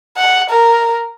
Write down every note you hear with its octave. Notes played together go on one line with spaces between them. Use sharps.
F#5
A#4